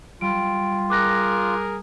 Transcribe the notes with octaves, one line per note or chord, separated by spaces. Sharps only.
G3 F4 D7
G#4 A#4 D6 F#6 A#6